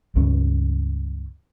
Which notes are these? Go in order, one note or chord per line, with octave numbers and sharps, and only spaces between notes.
C#2 G2 G3 C#4